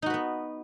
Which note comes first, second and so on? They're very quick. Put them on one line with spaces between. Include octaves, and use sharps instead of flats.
D#4 F#4 B4 B3